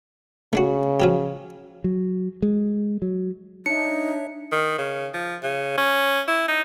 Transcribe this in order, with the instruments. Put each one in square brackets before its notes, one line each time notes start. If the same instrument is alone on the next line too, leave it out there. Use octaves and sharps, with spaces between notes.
[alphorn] C#3 [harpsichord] A3 D4 F#4
[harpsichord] F3 F#3 G4
[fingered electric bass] F#3
G#3
F#3
[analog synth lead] D4 [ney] D#4 [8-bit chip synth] C#5 E5 [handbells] C#7
[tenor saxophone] D#3
C#3
F3
C#3
C#4
E4
D#4